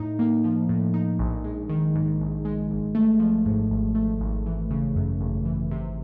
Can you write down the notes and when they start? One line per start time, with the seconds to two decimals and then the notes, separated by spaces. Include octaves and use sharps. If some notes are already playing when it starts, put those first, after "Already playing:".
Already playing: A2 D#4
0.19 A#3
0.44 F3
0.69 A2
0.94 D#4
1.19 A#1
1.44 G#3
1.69 D#3
1.95 G#2
2.20 A#1
2.45 G#3
2.70 G#1
2.95 A3
3.19 F3
3.46 G#2
3.71 G#1
3.95 A3
4.20 G#1
4.46 E3
4.70 C#3
4.95 F#2
5.20 G#1
5.46 E3
5.71 C3